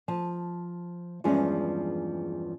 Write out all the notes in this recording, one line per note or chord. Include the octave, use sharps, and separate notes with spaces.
F3 A5
E2 G2 F3 G#3 C#4